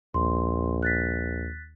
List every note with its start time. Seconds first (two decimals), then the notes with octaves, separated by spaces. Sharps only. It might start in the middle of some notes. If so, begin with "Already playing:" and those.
0.14 A#1 D#2 C6
0.83 F#6 A6 B6